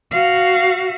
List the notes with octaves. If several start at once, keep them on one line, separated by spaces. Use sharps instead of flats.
F#4 F5